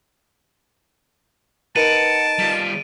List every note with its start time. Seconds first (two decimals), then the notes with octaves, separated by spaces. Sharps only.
1.76 D#4 A#4 B4 F#5 A5 D7 D#7
2.39 G3 F4